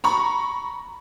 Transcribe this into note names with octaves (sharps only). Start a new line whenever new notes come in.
A#5 B5 C#6